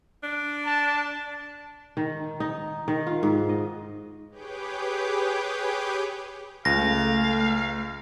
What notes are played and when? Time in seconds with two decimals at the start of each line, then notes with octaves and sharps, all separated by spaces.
0.23 D4
0.66 A5
1.97 D#3
2.40 D#4
2.88 D#3
3.07 F4
3.23 G#2
3.49 D#5
4.30 G4 G#4 B4 C#5 D6 G6
6.65 C#2 A3 F5 A#6